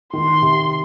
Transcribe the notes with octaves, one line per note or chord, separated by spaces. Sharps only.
D#3 C6
C3